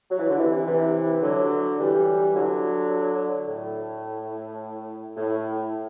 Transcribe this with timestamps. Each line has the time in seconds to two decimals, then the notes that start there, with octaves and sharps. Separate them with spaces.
0.10 F#3
0.19 E3
0.30 D3
0.39 C3 E3
0.66 C3 E3
1.23 D3 F#3
1.79 E3 G3
2.35 D3 F#3
3.48 A2
5.17 A2